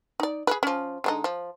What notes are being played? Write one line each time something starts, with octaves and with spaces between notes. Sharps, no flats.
D#4 D5
G#4 A#4 B4
F3 C#4
D3 G#3 D#4
F3